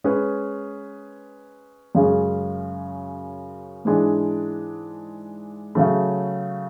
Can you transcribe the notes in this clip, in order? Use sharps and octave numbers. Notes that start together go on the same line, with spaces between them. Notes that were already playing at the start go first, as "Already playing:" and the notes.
G#3 C#4 G#4 B4
F#2 C#3 G#3 C#4
G#2 E3 G#3 D4 G#4
C#3 F#3 A3